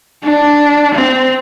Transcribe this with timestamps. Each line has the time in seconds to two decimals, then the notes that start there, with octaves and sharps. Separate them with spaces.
0.24 D4
0.95 C4